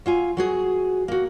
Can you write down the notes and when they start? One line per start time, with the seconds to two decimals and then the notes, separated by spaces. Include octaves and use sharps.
0.06 F#3 F4 G#5
0.37 F#3 F#4 G#4
1.08 A#3 F#4